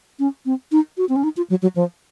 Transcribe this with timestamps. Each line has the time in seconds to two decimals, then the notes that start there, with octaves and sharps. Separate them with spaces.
0.19 C#4
0.46 C4
0.72 D#4
0.97 F#4
1.09 C4
1.16 C#4
1.24 D#4
1.37 F4
1.50 F#3
1.62 F#3
1.76 F3